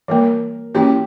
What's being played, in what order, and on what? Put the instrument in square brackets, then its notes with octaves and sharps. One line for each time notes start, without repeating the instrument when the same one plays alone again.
[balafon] E3 G3 A#3 [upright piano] A#4
[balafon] E3 A#3 C#4 E4 [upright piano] G4